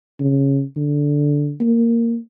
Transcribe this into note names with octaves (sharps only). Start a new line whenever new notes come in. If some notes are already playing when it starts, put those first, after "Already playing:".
C#3
D3
A#3